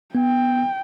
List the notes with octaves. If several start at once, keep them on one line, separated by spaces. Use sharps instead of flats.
B3 G5